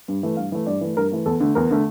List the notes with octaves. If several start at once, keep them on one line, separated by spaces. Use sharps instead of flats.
G2
E3 A3
G2 F5
E3 A3
G2 D5
E3 A3
G2 A#4
E3 A3
E2 A4
D3 A3
E2 A#4
D3 A3